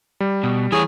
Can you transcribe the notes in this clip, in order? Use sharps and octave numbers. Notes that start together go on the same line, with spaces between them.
G3
B2
E3 G#4 C#5